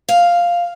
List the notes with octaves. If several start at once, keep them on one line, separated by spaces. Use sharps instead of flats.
F5